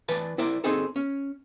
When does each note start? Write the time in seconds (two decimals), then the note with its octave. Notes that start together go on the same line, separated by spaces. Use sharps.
0.09 E3 B4 D5 A5
0.38 E4 A#4 C5 D5
0.64 C4 D#4 G#4 A4
0.96 C#4